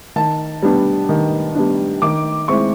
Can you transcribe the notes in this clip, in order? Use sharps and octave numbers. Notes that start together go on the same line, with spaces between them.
D#3 A5
G3 B3 D4
D#3
G3 B3 D4
D#3 D6
G#3 C4 E4 C#6